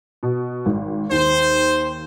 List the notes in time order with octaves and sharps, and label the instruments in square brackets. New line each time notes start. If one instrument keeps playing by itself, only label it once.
[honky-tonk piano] B2
G#1
[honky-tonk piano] D#2 [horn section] C5